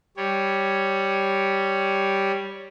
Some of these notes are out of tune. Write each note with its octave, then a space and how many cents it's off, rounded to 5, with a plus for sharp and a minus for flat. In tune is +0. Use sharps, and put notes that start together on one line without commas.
G3 +0 C#5 +0